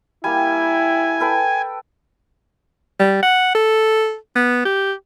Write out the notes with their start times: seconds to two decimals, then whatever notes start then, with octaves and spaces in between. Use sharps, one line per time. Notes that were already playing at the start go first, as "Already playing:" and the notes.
0.24 G3 A#3 E4 G#5
1.20 A4 B4 G5
2.99 G3
3.22 F#5
3.54 A4
4.35 B3
4.65 G4